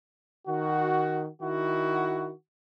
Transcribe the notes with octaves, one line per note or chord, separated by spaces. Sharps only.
D#3 F#4
D#3 E4 F#4